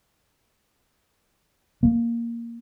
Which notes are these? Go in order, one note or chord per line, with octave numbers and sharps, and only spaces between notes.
A#3